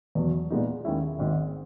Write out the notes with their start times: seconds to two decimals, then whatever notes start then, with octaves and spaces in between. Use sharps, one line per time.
0.15 E2 B2 F#3
0.50 A#2 G#3 B3 D#4
0.85 D#2 D#3 G#3 C#4 E4
1.19 G#1 G#2 D#3